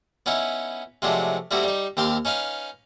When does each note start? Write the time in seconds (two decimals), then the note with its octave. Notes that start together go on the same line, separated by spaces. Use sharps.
0.26 B3 C#4 D#4 E4
1.02 C3 F3 F#3 G#3 A3 D4
1.51 G3 A3 C4 E4 F#4 G4
1.64 G3 D#4
1.97 D#2 C4 G4 F5 C6
2.25 C#4 D#4 B4 F5